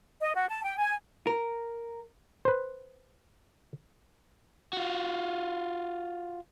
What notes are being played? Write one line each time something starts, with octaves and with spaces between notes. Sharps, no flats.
D#5
F#4
A5
G5
G#5
A#4
B4 C5
F4 F#4